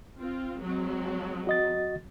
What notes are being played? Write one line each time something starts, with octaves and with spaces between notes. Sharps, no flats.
C4 F4
F#3 G#3 C4
F#4 D#5 A6